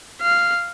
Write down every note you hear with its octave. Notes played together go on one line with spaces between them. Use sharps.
F5